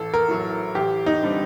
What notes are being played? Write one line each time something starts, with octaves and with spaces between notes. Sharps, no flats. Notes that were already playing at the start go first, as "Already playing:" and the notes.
Already playing: A1 A4
A#4
A2 F#3
A1 G4
D#4
D3 G3 C4